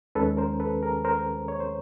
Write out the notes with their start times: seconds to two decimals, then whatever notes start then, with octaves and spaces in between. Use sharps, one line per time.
0.15 D#2 D#3 G#3 C#4 A4 B4
0.37 A#4 C5
0.60 A4 B4
0.83 G#4 A#4
1.05 A#4 C5
1.48 C#5
1.60 C5